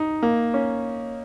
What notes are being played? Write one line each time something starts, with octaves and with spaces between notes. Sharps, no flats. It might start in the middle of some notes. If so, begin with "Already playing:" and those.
Already playing: D#4
A#3
C#4